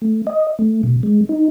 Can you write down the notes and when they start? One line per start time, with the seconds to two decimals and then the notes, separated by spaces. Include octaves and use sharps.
0.02 A3
0.27 D#5
0.59 A3
0.83 B2
1.03 G#3
1.29 D#4